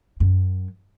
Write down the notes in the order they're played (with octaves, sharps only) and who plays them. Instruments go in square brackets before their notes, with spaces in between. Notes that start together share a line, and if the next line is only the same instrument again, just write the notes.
[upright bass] F#2